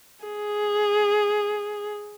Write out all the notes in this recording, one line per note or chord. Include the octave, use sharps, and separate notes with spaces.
G#4